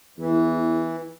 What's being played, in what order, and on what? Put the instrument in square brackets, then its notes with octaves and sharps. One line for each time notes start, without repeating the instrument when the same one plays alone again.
[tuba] E2 [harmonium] E3